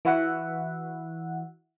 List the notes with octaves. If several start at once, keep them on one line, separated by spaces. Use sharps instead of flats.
E3 E4 F#4 E5 F#5